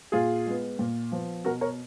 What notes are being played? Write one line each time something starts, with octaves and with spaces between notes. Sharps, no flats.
A#2 F4 G#4
G#3 B3
A#2
F3 B3
B2 F#4 A#4
A#4 C#5